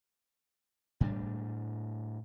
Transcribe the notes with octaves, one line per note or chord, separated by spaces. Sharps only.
A2 G3 D4